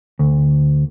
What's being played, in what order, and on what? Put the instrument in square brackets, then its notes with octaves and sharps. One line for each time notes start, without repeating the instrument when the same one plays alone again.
[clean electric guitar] D2